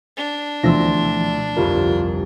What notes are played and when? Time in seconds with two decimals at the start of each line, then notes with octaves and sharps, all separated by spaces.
0.17 D4
0.63 D2 B2 E3 F3 C6 E6 A#6
1.57 G1 C2 F2 F4 A#4